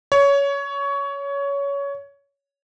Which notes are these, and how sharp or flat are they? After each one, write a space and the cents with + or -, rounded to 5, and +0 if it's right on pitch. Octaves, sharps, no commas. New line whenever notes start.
C#5 +20